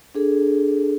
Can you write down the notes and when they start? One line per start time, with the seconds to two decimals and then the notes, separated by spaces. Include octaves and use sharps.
0.15 D4 G#4 A4